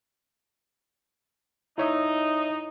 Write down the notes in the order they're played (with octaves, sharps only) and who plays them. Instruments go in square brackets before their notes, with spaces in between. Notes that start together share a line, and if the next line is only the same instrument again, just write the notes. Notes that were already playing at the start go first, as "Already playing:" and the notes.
[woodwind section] D#4 [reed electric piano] E4 C#5 E5